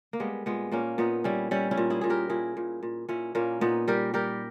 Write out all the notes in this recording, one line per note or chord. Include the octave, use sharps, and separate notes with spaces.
A#3
G3 G#3 B3
A#2 G#3 B3
A#2 A#3 C#4
A#2 B3 D#4
G3 C#4 E4
G3 C#4 E4
C#4 E4
A#2
E4 G#4
A#2 G#4
G4 A#4
A#2 E4 G#4
A#2
A#2
A#2 C#4 E4
A#2 A#3 C#4
A#2 B3 D#4
G3 G4 A#4
G3 G4 A#4